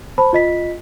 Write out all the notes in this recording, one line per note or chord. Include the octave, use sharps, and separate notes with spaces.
C5 A5 B5
F4 D#5 B6